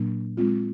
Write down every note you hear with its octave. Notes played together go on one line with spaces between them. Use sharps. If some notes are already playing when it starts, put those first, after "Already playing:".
Already playing: A#2 F#3 A#3 D4
G#3 C4 F4